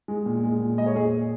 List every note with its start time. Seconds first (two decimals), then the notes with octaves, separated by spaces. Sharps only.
0.08 G#3
0.26 A#2
0.43 G#3
0.60 A#2
0.78 G#3 D#5
0.86 C#5
0.96 A#2 G#4